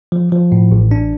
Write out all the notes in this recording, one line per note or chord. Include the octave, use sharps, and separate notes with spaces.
F3
F3
A2
A1
D4